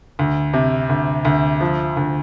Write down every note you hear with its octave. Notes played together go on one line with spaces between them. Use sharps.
D2
C3
D2
D2
F3
D2